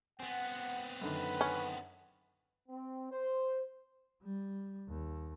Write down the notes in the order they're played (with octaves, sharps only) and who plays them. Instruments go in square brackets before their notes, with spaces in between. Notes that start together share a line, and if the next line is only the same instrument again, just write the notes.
[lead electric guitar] B3 C4 [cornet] F#5 [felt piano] G#5
[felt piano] F#2 D3 D#3 [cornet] B4
[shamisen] C#4
[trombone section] C4
C5
[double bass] G3
D#2